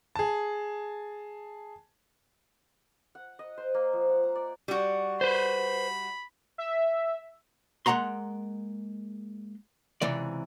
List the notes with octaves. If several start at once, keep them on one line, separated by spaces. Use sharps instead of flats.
G#4 A5
F#5
D#5
C5
A#3
F3
F#5
A#5
D5
G3 F#4
B4 C5 B5
E5
G#3 A#3 F#5 A#5 C6
C#2 C3 E3 D5